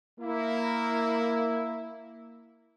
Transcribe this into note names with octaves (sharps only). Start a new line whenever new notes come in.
A#3 E4